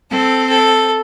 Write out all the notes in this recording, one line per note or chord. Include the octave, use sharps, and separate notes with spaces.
C4 A4
A4